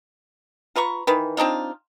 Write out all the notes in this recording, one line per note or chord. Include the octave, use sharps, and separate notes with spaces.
F4 B4 A#5 C#6
D#3 E3 B4
C4 D4 D#4 F4